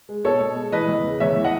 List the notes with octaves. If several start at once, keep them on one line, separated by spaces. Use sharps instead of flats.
G#3
B2 A4 C#5
B2
G#3
E3 B4 D#5
E2
C#3
E2 C#5 E5
E3
D#5 F#5